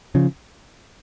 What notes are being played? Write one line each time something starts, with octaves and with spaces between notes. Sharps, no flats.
C#3 F3